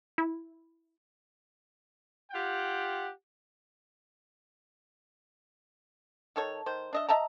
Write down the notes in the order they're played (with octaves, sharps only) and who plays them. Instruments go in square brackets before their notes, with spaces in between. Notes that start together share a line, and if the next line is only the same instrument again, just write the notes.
[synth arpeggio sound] E4
[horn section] F4 G4 F#5 G5
[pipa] D#3 A4 C#5
D#3 C5
D4 D#5 E5
D#5 E5 A5 A#5